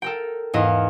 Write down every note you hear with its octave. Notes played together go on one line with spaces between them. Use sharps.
A4 A#4 G5
E2 G#2 E4 D#5 F5